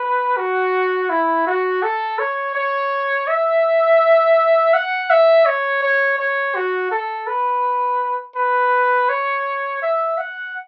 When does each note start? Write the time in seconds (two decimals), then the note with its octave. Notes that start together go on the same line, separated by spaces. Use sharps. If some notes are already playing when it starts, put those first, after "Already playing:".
Already playing: B4
0.37 F#4
1.09 E4
1.47 F#4
1.82 A4
2.19 C#5
2.55 C#5
3.28 E5
4.73 F#5
5.10 E5
5.46 C#5
5.83 C#5
6.19 C#5
6.55 F#4
6.91 A4
7.27 B4
8.36 B4
9.09 C#5
9.82 E5
10.18 F#5